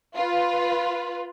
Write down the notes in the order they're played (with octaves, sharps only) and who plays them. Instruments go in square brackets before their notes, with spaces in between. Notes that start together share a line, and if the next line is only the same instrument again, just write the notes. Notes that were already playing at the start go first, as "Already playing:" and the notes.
[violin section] F4 B4